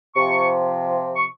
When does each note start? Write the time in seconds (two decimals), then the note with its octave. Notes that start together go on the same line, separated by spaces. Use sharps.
0.16 C3 F3 C#6
1.16 C#6